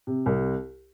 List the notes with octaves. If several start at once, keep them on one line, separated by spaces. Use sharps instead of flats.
C3
C2